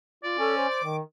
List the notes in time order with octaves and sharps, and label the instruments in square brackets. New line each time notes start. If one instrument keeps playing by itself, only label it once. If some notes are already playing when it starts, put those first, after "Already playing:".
[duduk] F4 [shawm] D5
[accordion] C#4 [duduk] A4
[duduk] C5
[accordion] D6
[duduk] D#3